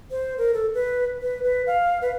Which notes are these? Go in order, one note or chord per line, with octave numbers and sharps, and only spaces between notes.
C5
A#4
A4
B4
B4
B4
F5
B4